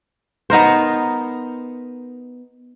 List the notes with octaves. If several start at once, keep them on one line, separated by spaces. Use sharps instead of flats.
B3 D#4 A#4 C5